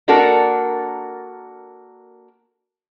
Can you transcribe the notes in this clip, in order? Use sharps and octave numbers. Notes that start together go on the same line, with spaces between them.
A#3 D4 F#4 A4 A#4